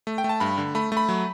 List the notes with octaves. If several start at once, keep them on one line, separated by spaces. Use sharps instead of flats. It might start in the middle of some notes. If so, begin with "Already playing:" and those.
A3
G5
A3
A5
G2 B5
D3
A3 B5
A3
B5
F#3